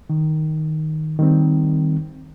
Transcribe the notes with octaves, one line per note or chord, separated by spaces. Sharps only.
D#3
D#3 G3 C4